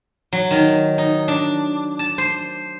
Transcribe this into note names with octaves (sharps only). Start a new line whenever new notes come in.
F#3
D#3
D#4
D4
A5
C5